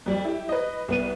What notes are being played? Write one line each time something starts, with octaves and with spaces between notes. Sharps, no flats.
F2 G3
E4 G4
B4 D#5
C2 B3 D#7